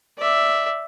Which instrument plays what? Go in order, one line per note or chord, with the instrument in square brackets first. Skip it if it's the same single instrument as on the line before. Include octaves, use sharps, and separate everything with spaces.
[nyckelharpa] D5 E5